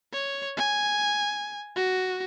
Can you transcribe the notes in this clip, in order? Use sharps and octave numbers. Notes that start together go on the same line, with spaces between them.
C#5
G#5
F#4